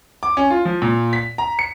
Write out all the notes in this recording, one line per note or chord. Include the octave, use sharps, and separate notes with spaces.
D6
C#4
F4
F3
A#2
B6
A#5
C#7